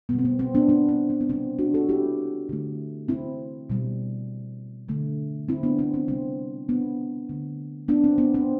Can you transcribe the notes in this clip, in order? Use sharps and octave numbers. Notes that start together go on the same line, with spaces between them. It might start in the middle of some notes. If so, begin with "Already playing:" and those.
B2 G3 B3
C4
B3
C4
B3 D4
B3 D4
C4
B3
B3
C3 G3 C4
D4 F#4
F#4 A4
E4 G4
D3 A3
C4 E4
B2 G3
D3 A3
C4 E4
B3 D4
C4
C4
C3 G3 C4
B3 D4
D3 A3
B3 D4
C4
B3
C4